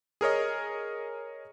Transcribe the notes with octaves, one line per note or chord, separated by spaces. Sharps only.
G#4 A#4 C#5 D#5